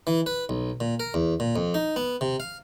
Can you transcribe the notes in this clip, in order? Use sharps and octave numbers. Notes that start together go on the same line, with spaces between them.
E3
B4
B1
A#2
A#4
E2
A#2
F2
D#4
B3
C3
F5